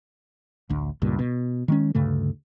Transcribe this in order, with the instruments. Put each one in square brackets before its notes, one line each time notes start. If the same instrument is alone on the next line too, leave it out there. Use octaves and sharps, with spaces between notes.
[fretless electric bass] A1 D2
C#2 G2 A#2
B2
D#3 G#3 C#4
D2 G2 C#3 A3